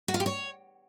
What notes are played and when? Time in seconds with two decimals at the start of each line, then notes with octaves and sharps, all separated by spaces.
0.08 F#4
0.14 F4
0.20 G4
0.26 C#5